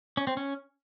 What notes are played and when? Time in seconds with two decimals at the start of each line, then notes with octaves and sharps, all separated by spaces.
0.17 C#4
0.27 C4
0.37 C#4